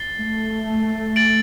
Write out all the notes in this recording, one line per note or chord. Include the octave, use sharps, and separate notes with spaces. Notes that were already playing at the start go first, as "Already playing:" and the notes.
Already playing: A6 C7 G7
A3
A6 D7 F#7